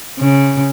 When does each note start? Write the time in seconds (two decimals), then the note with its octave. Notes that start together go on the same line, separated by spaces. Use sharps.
0.20 C#3